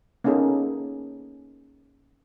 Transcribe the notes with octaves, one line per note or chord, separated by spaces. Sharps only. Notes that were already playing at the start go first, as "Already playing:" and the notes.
A#3 B3 C#4 D#4 G#4 A4